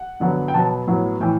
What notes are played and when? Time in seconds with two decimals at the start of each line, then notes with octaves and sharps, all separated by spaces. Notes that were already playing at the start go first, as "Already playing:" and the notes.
Already playing: F#5
0.20 G2 D3 F#3 B3
0.48 G5
0.54 B2 F#3 B3 A5
0.87 A2 F#3 B3
1.20 A2 E3 G5